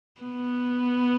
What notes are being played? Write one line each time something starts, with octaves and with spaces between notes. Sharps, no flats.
B3